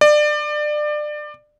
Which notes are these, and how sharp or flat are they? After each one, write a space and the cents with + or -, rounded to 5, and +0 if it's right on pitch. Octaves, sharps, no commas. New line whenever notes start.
D5 +25